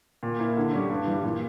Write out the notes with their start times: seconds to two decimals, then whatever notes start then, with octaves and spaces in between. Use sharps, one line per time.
0.23 A#2
0.40 A#3 E4
0.57 D3
0.73 G3 C#4
0.89 G2
1.07 E3 G3
1.23 A#2